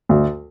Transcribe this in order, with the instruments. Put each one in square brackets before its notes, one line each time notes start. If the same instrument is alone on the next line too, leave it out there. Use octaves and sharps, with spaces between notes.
[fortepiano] D2